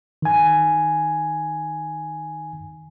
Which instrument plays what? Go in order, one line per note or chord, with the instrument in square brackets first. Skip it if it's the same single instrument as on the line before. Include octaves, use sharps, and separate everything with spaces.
[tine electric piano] D#3 G#5